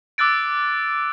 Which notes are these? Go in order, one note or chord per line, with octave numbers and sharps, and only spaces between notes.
D6 E6 F#6 A6 D7